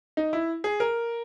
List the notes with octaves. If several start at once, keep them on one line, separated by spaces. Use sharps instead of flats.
D#4
E4
G#4
A#4